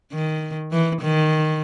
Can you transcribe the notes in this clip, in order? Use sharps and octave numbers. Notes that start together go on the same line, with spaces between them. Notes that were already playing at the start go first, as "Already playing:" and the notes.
D#3
E3
D#3